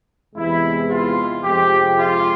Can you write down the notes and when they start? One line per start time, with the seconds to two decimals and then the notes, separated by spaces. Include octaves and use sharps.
0.35 E2 C3 E3 G#3 E4
0.90 F4
1.43 F2 C3 F3 G#3 G4
1.97 F4